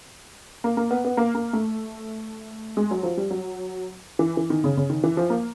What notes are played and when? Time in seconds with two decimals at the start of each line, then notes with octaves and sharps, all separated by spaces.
0.64 A#3
0.77 A#3
0.91 B3
1.05 B3
1.17 A#3
1.35 A#3
1.53 A3
2.77 G#3
2.91 F#3
3.03 F3
3.17 G3
3.31 F#3
4.19 E3
4.37 E3
4.50 D#3
4.64 C#3
4.77 C#3
4.90 D#3
5.03 E3
5.17 F3
5.30 A#3